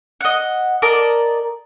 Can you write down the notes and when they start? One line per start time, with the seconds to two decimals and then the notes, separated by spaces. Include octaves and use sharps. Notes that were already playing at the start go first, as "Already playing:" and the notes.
0.21 D#5 F#5
0.82 A#4 D5 D#5 A5